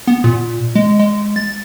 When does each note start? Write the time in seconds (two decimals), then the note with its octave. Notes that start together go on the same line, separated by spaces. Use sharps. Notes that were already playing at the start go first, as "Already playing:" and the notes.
0.07 B3
0.24 A#2
0.75 G#3
0.99 G#3
1.36 A6